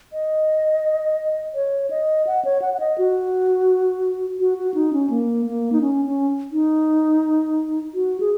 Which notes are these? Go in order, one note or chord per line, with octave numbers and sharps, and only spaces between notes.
D#5
C#5
D#5
F#5
C#5
F#5
F#5
D#5
F#4
F#4
F#4
D#4
C#4
A#3
A#3
D#4
C#4
C#4
D#4
F#4
G#4